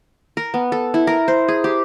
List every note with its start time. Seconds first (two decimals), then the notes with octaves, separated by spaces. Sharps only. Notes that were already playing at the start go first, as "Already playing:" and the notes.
0.37 A#4
0.54 B3
0.72 A4
0.94 E4
1.07 A#4
1.28 C5
1.48 G#4
1.64 G4